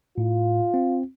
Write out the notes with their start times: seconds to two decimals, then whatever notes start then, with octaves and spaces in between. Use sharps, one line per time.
0.18 A2 F4
0.74 C4